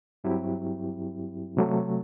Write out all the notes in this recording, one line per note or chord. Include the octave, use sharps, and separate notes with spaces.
G2 F#3 C4 E4 G4
C3 F#3 A3